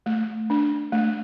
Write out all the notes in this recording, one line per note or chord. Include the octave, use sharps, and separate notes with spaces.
A3
D4
A3